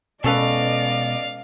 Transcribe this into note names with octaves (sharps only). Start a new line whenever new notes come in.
B2 G#3 C#4 A4 B4 D5 D#5 F5